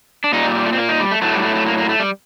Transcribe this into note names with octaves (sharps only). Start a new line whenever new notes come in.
D4
A#2 G3 D#4
G3
G3
A3
C4
A#3
D#4
G3
A3
A2 F#3 A3
G3
A3
A3
A#3
A#3
A3
G3